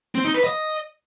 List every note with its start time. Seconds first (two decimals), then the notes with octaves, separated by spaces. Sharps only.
0.15 C4
0.25 D#4
0.34 B4
0.44 D#5